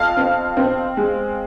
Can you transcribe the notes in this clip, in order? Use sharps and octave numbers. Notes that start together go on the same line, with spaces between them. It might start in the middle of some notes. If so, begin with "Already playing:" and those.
Already playing: F2 F5
C4
C4
G#3